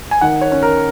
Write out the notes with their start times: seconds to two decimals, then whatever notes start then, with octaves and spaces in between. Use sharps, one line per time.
0.11 G#5
0.21 D#3 F#5
0.41 C#5
0.52 C#4
0.63 A#4